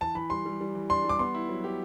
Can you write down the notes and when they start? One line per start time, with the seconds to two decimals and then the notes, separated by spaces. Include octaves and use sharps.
0.01 E3 A5
0.15 E3 B5
0.30 G3 C6
0.46 G3
0.60 G3
0.75 E3
0.90 D4 C6
1.05 G3 D6
1.19 B3 C6
1.34 E4
1.49 F#3
1.64 G4